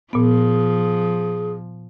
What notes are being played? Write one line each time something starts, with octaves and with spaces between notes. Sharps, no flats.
A#2 F3 B3 G#4